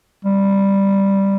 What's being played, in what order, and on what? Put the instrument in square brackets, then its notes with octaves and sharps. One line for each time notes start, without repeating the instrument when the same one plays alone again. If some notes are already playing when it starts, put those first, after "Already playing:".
[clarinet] G3